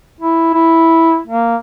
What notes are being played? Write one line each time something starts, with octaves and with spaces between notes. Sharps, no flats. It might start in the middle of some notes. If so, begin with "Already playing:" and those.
E4
E4
A#3